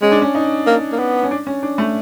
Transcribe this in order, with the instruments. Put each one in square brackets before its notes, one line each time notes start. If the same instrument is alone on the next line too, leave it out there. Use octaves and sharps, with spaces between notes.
[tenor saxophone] G#3 [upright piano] C#4
[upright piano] D4
C#4
D#4
[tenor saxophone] A#3
A#3
B3
[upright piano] C#4
D4
C#4
D4
A3